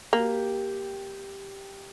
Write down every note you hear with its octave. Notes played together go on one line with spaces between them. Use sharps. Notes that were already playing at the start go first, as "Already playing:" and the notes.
A#3 G4